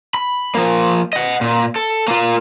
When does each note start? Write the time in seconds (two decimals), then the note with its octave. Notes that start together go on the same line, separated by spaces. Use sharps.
0.14 B5
0.55 F3 A#3
1.13 D#5 F#5
1.41 A#2
1.76 A4
2.08 A#3 F4